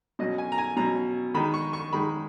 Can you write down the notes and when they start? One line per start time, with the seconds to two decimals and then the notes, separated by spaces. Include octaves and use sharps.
0.19 B2 F#3 C#4 D#5
0.38 G#5
0.52 A#5
0.58 G#5
0.76 B2 F#3 C#4 A#5
1.34 D#3 G#3 D#4 B5
1.54 C#6
1.73 C#6
1.93 D#3 G#3 D#4 B5